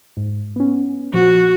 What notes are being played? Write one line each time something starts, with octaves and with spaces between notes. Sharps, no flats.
G#2
B3 C#4
A#2 F3 F#4